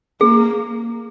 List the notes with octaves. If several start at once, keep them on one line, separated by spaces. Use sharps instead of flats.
A#3 G#4